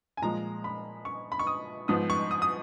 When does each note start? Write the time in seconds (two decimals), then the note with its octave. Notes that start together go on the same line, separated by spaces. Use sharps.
0.17 G#5
0.22 A#2 F3 G#3 A#5
0.64 B5
1.05 C#6
1.32 B5
1.39 C#6
1.47 D#6
1.88 G#2 F3 B3 D#6
2.10 C#6
2.31 D#6
2.42 D#6